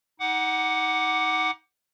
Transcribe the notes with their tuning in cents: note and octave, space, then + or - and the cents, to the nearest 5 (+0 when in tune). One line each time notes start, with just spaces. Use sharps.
D#4 +30 F#5 +10 D6 +0